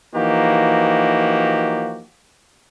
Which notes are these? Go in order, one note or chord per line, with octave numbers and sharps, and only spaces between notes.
E3 F3 A#3 D#4 F#4 G4